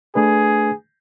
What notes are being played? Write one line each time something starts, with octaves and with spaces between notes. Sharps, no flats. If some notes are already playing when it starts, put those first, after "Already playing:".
A3 D4 G#4 B4